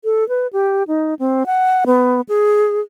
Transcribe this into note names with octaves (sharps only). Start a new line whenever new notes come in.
A4
B4
G4
D#4
C4
F#5
B3
G#4